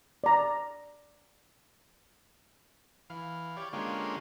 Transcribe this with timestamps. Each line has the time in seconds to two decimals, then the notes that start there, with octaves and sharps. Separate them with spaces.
0.24 D5 A#5
3.10 E3 F5
3.57 G4 C#5 D5
3.73 D3 G#3 A#3 C#4 F4 G4